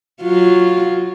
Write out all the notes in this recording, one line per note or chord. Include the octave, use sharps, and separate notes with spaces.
F#3 F4